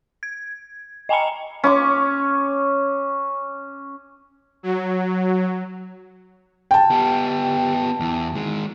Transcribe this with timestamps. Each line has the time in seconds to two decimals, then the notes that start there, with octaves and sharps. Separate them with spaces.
0.23 G#6
1.09 D#5 G5 G#5 A#5 B5 C#7
1.64 C#4 C#6 D6
4.63 F#3
6.71 G5 A5
6.90 B3 G4
8.00 E2
8.36 D#3 G#3